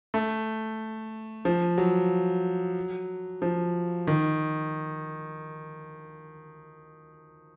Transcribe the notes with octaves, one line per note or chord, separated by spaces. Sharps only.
A3
F3
F#3
F3
D#3